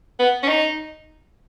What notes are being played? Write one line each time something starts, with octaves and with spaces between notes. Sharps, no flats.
B3
C#4
D#4